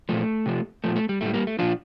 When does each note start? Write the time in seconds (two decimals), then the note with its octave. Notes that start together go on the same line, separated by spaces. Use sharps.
0.09 A#2 F3 A3
0.46 C3 F3
0.84 A#2 F3 A3
0.96 A3
1.09 G3
1.21 A2 G3 A3
1.34 G3 A#3
1.47 A3
1.59 A#2 F3 D4 F4